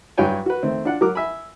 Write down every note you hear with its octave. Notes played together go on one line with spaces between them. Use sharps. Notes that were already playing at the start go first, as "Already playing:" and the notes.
G2 F#3 D4 C#5 G5 G#5
F#4 B4
D#3 A3 C4
D4 F4 F#5
F#3 A#4 D6
E5 G#5 B5